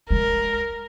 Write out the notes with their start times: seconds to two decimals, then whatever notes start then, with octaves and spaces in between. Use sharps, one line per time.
0.11 G#3 A#4